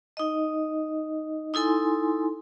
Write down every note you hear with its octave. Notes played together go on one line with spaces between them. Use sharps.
D#4 D#5
D#4 E4 A4 G#5 C6